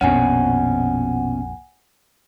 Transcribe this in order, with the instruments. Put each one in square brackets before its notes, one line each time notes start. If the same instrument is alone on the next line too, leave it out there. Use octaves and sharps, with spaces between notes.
[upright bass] A#1 F2 [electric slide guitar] B2 C#4 [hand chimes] F#5 G#5